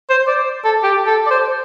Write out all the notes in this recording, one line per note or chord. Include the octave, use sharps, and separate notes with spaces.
C5
D5
A4
G4
A4
D5
C5